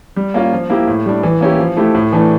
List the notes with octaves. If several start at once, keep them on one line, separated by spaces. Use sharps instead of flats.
G3
A#3 C#4 F4
F3
A#3 E4 G4
A2
G3 D4
E3
A#3 C#4 E4 G4
F3
A3 E4 G4
A2
E3 A3 D4